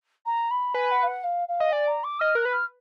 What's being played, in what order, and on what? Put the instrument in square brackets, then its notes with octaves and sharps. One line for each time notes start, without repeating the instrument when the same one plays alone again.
[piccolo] A#5
B5
[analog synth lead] B4 [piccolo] G#5
[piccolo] F#5
F5
F#5
F5
F5
[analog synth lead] D#5
[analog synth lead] D5 [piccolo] G#5
[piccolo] A#5
D6
[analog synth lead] D#5 [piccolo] F6
[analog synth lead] A#4 [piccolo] F#6
[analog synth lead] B4
[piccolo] F6